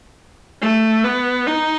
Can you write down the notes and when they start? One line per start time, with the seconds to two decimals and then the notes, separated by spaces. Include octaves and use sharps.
0.61 A3
1.04 B3
1.47 D#4